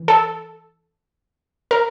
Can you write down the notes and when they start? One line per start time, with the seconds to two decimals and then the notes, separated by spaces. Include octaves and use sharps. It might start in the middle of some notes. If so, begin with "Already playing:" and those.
Already playing: E3
0.08 A4
1.71 A#4